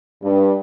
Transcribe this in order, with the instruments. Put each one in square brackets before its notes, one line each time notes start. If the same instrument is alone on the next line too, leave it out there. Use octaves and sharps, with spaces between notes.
[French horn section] G2